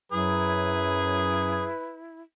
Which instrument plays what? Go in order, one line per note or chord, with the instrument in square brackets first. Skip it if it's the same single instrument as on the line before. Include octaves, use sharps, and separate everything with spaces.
[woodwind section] F#2 F#3 [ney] E4 [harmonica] G#4 [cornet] B4